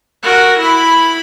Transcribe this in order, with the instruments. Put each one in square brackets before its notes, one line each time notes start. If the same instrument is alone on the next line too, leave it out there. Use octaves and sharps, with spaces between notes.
[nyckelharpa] F#4 A#4
E4 B5